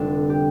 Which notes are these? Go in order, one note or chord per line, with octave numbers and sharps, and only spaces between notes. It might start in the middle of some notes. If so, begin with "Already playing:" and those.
Already playing: F1 F2 D3 G3 C4 D4
G4